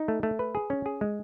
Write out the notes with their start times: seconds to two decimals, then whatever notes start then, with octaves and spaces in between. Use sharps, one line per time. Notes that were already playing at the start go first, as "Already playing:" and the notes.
Already playing: D#4
0.08 A3
0.23 A3
0.39 B4
0.55 G#4
0.70 C#4
0.86 G#4
1.01 G#3